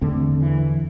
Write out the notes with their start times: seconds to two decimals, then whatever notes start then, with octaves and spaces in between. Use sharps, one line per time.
0.01 E2 D3 A3 C4
0.41 E3